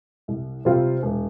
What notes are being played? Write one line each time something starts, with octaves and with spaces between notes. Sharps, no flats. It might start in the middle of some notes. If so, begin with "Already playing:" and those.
C2
C3 G3 C4 F4
E1